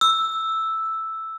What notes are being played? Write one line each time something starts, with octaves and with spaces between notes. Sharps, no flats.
E6